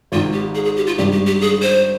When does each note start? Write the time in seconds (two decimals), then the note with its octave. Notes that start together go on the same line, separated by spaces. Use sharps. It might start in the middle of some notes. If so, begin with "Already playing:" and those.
0.12 G#1 G#2 D#3 F4
0.33 G4
0.55 G#4
0.65 G#4
0.76 G4
0.87 F4
0.98 G#1 G2 D#3 G4
1.12 G4
1.27 G4
1.41 G#4
1.62 C5